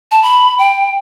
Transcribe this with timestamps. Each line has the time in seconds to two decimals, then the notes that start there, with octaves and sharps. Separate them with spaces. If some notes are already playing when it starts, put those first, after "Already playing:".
0.11 A5
0.22 B5
0.59 G5